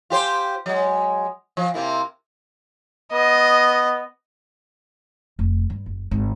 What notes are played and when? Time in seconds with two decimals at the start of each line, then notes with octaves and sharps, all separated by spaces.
0.10 F4 G4 C5
0.66 F#3 G#3
1.57 F3
1.74 C3 A#3 E4
3.12 B3 D#5
5.39 F1
5.70 G2
5.86 F#1
6.11 G#1